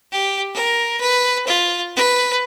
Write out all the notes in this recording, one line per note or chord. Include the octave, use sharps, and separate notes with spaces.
G4
A#4
B4
F4
B4